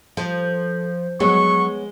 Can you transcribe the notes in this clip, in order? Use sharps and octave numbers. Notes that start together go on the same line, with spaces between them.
F3 A4 D#5
F#3 G#3 B3 C#5 C#6